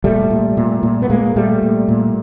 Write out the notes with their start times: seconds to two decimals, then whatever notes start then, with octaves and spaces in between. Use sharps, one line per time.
0.04 A#2 G3 A3
0.30 A#2
0.57 A#2
0.83 A#2
1.02 B3
1.10 A#2 G#3 A#3
1.36 A#2 G3 A3
1.62 A#2
1.88 A#2